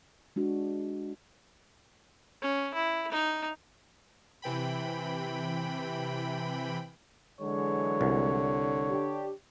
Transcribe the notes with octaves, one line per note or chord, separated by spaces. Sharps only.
G#3 D4 F#4
C#4
E4
D#4
C3 E3 G5 B5
D3 E3 F#3 G#3 C#5
C2
D4 G4